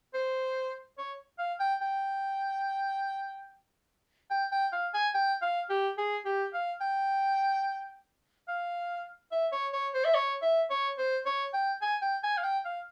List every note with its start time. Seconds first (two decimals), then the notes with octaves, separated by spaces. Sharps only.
0.14 C5
0.98 C#5
1.39 F5
1.60 G5
1.81 G5
4.31 G5
4.52 G5
4.73 F5
4.94 G#5
5.14 G5
5.42 F5
5.70 G4
5.98 G#4
6.26 G4
6.54 F5
6.81 G5
8.48 F5
9.32 E5
9.52 C#5
9.73 C#5
9.94 C5
10.04 E5
10.15 C#5
10.42 E5
10.70 C#5
10.98 C5
11.26 C#5
11.54 G5
11.82 G#5
12.02 G5
12.24 G#5
12.37 F5
12.44 G5
12.65 F5